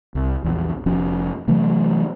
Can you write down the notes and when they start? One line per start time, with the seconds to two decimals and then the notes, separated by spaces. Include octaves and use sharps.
0.15 C2
0.44 A#1 E2
0.86 F1 F3 C#4
1.48 C3 E3 F#3 A3